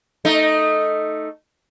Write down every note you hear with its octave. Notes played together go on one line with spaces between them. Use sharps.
A3 D#4